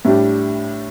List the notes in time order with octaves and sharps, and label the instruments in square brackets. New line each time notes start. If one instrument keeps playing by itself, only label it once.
[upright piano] A2 G3 D4 G4